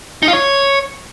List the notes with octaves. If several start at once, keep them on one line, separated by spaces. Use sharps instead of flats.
D#4
F4
C#5